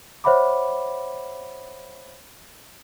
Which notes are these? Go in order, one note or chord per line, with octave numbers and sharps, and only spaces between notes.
C5 C#5 E5 F#5 B5 D6